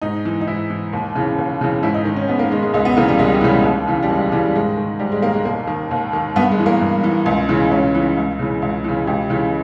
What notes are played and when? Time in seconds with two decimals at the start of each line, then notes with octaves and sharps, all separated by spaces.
0.02 G#2 D#4
0.25 E3
0.41 D#4
0.47 G#2 E4
0.70 E3
0.93 D#2
1.15 C#3 E3
1.38 D#2
1.61 C#3 E3
1.83 G#2 E4
1.94 D#4
2.05 D#3
2.16 C#4
2.28 G#2 B3
2.39 A#3
2.50 D#3 G#3
2.62 G#3
2.74 C#2 G#3
2.85 B3
2.96 C#3 E3 A#3
3.08 G3
3.19 C#2 G#3
3.34 G3
3.41 C#3 E3
3.49 G#3
3.64 D#2
3.87 C#3 E3
4.03 G3
4.10 D#2 G#3
4.32 C#3 E3 G3
4.54 G#2 G#3
4.77 D#3
4.99 G#2 G3
5.12 G#3
5.22 D#3 A#3
5.34 G#3
5.45 D#2 A#3
5.67 D#3
5.91 D#2
6.13 D#3
6.36 G2 B3
6.51 G#3
6.59 E3
6.66 A#3
6.81 G2
7.04 E3
7.26 C#2
7.49 C#3 E3
7.71 C#2 C#4
7.95 C#3 E3
8.17 C#2
8.39 C#3 E3
8.62 C#2
8.84 C#3 E3
9.07 C#2 G4
9.30 C#3 E3